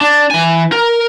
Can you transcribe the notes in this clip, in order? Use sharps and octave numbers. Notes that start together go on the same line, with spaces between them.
D4
E3 G#5
A#4